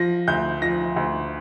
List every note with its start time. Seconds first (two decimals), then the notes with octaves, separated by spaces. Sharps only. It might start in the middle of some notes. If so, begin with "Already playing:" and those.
Already playing: F3 A#6
0.28 D2 G6
0.62 F3 A#6
0.96 D2